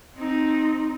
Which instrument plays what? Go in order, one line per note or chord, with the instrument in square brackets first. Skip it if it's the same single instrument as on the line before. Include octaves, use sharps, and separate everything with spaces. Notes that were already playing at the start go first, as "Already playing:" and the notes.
[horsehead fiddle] C4 D#4